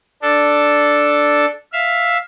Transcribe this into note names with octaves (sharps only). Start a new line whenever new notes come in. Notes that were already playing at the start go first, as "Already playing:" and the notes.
D4 A4
E5 F5